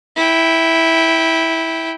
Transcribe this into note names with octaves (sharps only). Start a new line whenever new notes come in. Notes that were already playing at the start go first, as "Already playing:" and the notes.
E4 G5